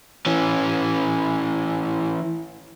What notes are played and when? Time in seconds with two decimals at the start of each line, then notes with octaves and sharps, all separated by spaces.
0.26 E3 C#4